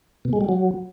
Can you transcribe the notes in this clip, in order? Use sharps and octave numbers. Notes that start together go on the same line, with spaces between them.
B2
G#3
G3
F#3